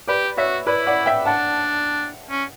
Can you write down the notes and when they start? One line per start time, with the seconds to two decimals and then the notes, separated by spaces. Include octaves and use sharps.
0.08 G4 B4 D5
0.37 F#4 C#5 E5
0.67 E4 B4 D5
0.86 D5 F#5
1.06 E5 G5
1.25 D4 F#5 A5
2.30 C#4